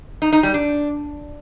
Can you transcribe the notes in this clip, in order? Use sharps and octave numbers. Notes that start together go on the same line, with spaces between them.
D#4
D#4
G3
D4